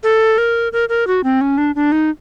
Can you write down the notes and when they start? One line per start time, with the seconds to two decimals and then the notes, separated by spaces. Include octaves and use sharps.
0.03 A4
0.38 A#4
0.73 A#4
0.89 A#4
1.07 F#4
1.24 C4
1.41 C#4
1.58 D4
1.75 D4
1.92 D#4